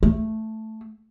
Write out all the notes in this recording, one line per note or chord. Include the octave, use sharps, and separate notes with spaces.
A3